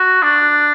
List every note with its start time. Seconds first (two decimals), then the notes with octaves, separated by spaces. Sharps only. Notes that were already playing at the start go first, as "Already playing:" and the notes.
Already playing: F#4
0.22 D4